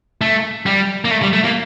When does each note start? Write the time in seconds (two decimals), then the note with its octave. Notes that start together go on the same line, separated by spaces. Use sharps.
0.21 A3
0.66 G3
1.05 A#3
1.11 A3
1.22 G3
1.33 A3
1.45 A#3